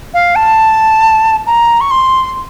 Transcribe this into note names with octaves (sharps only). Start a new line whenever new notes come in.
F5
A5
A#5
C#6
C6